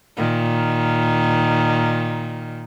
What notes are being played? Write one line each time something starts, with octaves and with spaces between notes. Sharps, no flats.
A#2 D#3